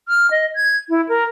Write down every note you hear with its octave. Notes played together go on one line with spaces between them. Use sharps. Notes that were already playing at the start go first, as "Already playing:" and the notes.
F6
D#5
G#6
E4
A#4